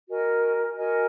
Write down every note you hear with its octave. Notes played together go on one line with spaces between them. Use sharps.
F#4 A#4 D#5 G#5
F#4 A#4 D#5 G#5